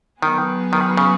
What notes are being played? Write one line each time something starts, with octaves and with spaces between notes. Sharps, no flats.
D#3 F#3 B3 G#4 B4
D#3
C#3